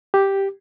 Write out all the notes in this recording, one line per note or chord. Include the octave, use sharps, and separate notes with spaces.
G4